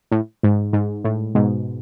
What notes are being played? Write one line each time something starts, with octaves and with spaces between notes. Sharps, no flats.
A2
G#2
G#2
A2
G#2 B2